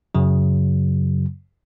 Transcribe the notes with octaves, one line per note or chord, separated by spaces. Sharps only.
F#2 C#3 F#3